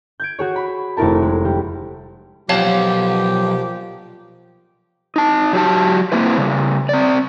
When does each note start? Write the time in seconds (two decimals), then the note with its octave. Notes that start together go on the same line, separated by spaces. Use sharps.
0.20 G6 G#6 D7
0.39 F#4 G#4 C#5
0.56 B5
0.97 F1 A3 E4 A#4 A5
1.22 G#3
1.45 G3
2.49 B1 A#2 F3 G4 C#5 F5 A5
5.16 D#4 A5
5.53 F#3 G4 A5
6.12 A#3 C4 E4 B4
6.38 C#3 G3
6.89 C4 D5